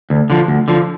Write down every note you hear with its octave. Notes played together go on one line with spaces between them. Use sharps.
D2
D3 F3
D2
D3 F3